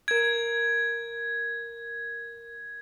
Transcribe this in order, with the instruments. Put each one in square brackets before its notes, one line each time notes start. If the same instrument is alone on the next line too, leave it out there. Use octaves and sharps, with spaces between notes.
[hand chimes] A#4 D7 [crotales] G#6